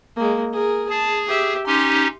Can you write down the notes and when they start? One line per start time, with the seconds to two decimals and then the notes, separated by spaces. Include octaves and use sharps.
0.16 G#3 A#3
0.52 G#4 A#4
0.90 G#4 A5
1.27 G4 E5
1.67 C#4 D#4 G4 C6